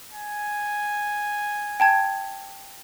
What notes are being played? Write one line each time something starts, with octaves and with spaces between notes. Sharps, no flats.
G#5
G5 A5 G#6